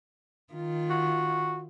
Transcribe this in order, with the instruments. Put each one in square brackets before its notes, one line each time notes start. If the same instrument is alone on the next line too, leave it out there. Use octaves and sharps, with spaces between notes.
[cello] D#3 F4
[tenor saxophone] F#4